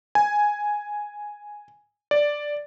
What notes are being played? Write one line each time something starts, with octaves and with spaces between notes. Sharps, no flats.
G#5
D5